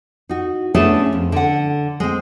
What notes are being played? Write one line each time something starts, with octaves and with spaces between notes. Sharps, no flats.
D#4 F#4
A3 B3 C#4 D4 G#4 A5
F2
D3 F#5
G#3 C4